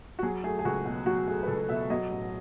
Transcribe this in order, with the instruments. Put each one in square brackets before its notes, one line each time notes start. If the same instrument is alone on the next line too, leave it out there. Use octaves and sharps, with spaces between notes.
[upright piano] F#4
F#3 G#4
A3 G#4
G#4
C#2 F#4
B2
F#3 F#4
A3 G#4
B4
C#2 A4
B2 E5
F#3 D#5
A1